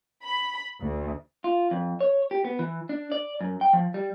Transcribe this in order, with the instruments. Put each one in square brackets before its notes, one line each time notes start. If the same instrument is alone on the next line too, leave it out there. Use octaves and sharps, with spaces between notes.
[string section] B5
D2
[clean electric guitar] F4
F2
C#5
G4
B3
E3
D4
D5
F#2
G5
F3
G3